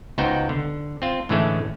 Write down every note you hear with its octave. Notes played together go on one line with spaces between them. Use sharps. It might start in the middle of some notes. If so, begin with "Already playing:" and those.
C#2 B3 D#4 F#4 C5 G5
D3
C4 F4
A2 D3 E3 G#3 A3 C#4